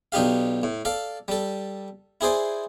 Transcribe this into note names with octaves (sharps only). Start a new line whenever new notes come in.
B1 D4 D#4 G4 F5
A2
A4 D5 F5
G3 A4
E4 G#4 C5 D5